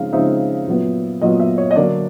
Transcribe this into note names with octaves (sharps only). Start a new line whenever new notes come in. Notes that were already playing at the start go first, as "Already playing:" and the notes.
Already playing: C#3 F3 G#3 C4 D#4 F5
C#3 F3 G#3 C4 D#4 E5
A#2 F#3 B3
A#2 F#3 B3 D#5
E5
C#5
D#5
D3 F#3 A#3 D4 D5